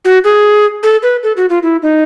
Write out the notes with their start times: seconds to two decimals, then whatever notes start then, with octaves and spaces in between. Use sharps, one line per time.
0.05 F#4
0.24 G#4
0.83 A4
1.03 B4
1.23 A4
1.37 F#4
1.50 F4
1.63 E4
1.82 D#4